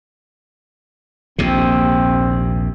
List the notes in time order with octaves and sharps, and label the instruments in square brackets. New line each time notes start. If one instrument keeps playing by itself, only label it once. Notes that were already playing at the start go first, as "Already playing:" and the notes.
[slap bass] A#1 D#2 C3 [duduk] C4